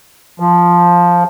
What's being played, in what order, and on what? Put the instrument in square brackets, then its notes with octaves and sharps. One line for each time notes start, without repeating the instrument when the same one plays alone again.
[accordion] F3